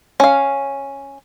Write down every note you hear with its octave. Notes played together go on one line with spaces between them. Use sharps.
C#4 F5